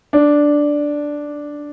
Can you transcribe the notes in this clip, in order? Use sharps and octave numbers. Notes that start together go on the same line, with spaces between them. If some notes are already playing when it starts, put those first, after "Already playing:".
D4